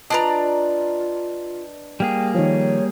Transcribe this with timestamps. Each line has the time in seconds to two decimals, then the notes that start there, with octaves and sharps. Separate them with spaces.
0.10 D4 F4 B4 D5 D#5 A#5
2.00 G3 A#3 G#4 G5
2.35 D#3 F3 C#5